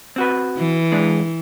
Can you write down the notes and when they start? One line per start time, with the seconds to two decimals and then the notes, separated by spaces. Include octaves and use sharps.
0.16 C4 F#4 B4
0.58 E3
0.92 E2 G#3 D4